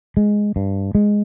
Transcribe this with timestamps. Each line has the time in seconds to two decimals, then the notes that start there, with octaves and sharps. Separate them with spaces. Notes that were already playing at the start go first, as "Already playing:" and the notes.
0.17 G#3
0.56 G2
0.95 G#3